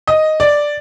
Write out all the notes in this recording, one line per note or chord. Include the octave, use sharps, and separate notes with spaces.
D#5
D5